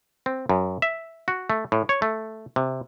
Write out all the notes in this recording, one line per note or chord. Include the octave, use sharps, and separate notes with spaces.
C4
F#2
E5
F#4
A3
A2
C#5
A3
C3